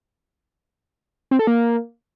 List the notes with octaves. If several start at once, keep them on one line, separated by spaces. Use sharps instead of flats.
C4
A4
A#3